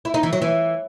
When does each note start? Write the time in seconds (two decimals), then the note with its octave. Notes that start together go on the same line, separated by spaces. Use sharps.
0.05 E4
0.14 D#4
0.23 E3
0.33 F#3
0.42 E3